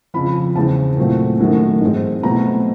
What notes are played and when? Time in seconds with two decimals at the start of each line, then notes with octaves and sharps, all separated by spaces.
0.14 F2 C#3 F3 B5
0.55 E2 C#3 E3 G#3 C4 A5
0.97 A#2 F#3 A3 C4
1.39 F#2 D#3 F#3 A3
1.81 G#2 E3 G#3 C4
2.23 B2 F#3 A3 C4 A#5